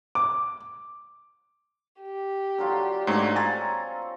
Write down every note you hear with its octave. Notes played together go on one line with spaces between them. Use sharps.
D6
G4
D3 F#3 F4
G#2 A3 C4 D4 C#5 A#5
F4 A4 G#5 A#5 A6